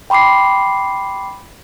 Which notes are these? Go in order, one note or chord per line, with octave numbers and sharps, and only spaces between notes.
G5 B5 C6 D6 C7